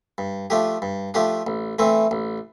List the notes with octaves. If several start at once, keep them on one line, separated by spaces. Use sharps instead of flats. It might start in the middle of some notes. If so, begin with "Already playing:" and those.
G2
F3 A3 D4 G4
G2
F3 A3 D4 G4
A1
A2 E3 A3 C4
A1